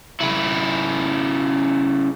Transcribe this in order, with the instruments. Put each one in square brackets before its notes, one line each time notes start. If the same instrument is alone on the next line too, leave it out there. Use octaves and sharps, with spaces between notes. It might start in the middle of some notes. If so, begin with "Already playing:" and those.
[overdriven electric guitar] C#3 E4